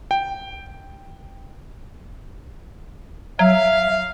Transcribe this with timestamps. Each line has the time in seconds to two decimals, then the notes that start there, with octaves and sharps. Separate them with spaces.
0.11 G5
3.39 F#3 E5 F5